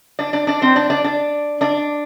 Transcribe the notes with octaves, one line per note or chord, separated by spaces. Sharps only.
D4 D5
D4 D5
D4 D5
C4 C5
D4 D5
D4 D5
D4 D5
D4 D5